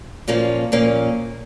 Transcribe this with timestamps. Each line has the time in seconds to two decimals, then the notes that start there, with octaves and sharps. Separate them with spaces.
0.28 A#2 F3 A#3 C#4
0.72 A#2 F3 A#3 C#4